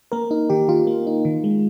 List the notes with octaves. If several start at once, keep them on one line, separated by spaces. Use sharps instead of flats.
A#3 A#4
D#4
D#3 G4
D#3 F4
A#3
D#4
D#3
G#3